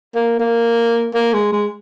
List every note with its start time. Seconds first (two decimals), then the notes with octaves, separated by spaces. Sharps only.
0.15 A#3
0.40 A#3
1.14 A#3
1.34 G#3
1.52 G#3